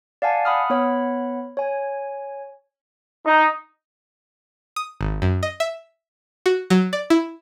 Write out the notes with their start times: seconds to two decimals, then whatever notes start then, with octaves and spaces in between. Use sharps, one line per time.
0.22 D5 F5 F#5 G#5 A5
0.45 F#5 B5 D#6 F6
0.70 B3 C#5 F#5 B5
1.57 C#5 G#5
3.26 D#4
4.76 D#6
5.01 G#1
5.22 F#2
5.43 D#5
5.60 E5
6.46 F#4
6.70 F#3
6.93 D5
7.10 E4